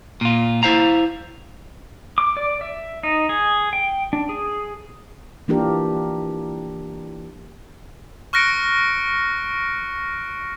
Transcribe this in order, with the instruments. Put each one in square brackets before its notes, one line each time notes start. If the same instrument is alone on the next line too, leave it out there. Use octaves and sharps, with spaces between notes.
[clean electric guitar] A#2 F4
E4 C5 F5 A#5
[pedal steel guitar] D6
D5
E5
D#4
G#4
G5
D4
G#4
[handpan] E3 A#3 D4 F4 G4 A#4
[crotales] C#6 F6 F#6 A#6 C#7 D7